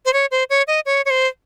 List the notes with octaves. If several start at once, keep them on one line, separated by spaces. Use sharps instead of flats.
C5
C#5
C5
C#5
D#5
C#5
C#5
C5